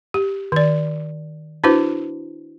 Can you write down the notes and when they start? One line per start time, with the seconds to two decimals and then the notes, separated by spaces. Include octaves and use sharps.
0.14 G4
0.52 D#3 D5
1.64 D4 E4 F#4 B4 C5